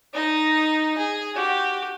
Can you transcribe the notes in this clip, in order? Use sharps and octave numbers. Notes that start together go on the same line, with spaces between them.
D#4 D#5
G#4
F#4 G4